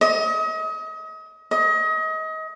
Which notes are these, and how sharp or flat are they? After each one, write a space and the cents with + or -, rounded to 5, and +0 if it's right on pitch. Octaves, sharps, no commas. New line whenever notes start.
D#5 +35
D#5 +30